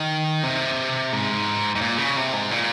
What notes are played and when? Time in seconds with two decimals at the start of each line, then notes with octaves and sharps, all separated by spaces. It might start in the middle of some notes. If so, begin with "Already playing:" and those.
Already playing: D#3
0.43 C3
1.13 G#2
1.75 G#2
1.81 A#2
1.98 C#3
2.16 C3
2.33 G#2
2.51 A#2